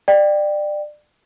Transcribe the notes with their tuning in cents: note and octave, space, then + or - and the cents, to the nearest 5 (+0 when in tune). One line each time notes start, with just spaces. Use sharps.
D5 +25 G5 +0